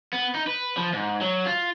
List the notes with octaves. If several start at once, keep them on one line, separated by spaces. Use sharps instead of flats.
B3
D#4
B4
F3
G#2
F#3
F4